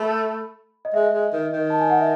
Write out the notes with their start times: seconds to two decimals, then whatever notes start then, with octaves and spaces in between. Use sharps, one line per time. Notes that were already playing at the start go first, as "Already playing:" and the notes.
Already playing: A3 B5
0.85 D#5
0.94 G#3 E5
1.13 G#3
1.33 D#3
1.52 D#3
1.70 A5
1.80 G#5
1.90 F#5
2.00 E5